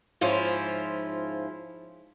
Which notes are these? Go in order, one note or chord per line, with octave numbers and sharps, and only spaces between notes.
G#2 F3 C#4 E4 F4